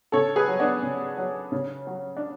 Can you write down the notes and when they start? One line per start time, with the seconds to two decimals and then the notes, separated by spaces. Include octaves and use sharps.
0.12 C#3 A4 C#5
0.36 G#4 B4
0.48 F#3
0.59 B3 D4
0.83 C#3
1.17 F#3
1.52 C#3
1.87 F#3
2.17 D4